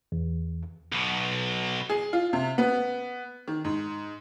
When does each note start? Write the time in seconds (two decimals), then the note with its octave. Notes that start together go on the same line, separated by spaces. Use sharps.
0.12 E2
0.92 B1 B2
1.90 G#4
2.13 F4
2.33 C3
2.58 B3
3.48 D#3
3.65 G#2